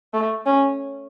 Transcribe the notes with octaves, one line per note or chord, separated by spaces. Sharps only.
A3
C#4